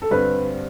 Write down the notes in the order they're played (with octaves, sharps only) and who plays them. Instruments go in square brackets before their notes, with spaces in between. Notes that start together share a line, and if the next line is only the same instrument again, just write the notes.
[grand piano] A4
[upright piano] G2 D3 G3 C4 [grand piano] B4